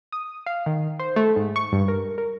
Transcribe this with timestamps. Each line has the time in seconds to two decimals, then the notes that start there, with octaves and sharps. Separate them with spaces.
0.12 D#6
0.46 F5
0.66 D#3
0.99 C5
1.16 A3
1.36 G#2
1.56 C#6
1.72 G2
1.88 A#4
2.18 A#4